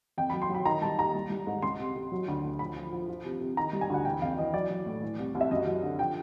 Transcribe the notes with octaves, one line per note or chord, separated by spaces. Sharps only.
F2 G5
F#3 B5
C6
F#3 B5
D#3 A#5
G3 A5
D#2 A#5
G3
G3
G#2
C#2 C6
C3
C3
F#3
D2
D2
F3 B5
F3
F3
F3
C3
C3
D#3 A#5
G3
G#5
D2 F#5
E3 G5
F2 F5
E3 D#5
F#3 D5
F#3
A2
E3
C2
C2
E5
F#2 D#5
F#3
D3
F3 G5